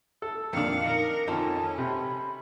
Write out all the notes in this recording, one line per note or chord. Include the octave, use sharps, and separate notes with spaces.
A4 E6
F2 A#2 D#3 D4 F5 C#7
D#4 A#4
F2 D#3 C#4 D#4 A4 C5 A5
C3 B5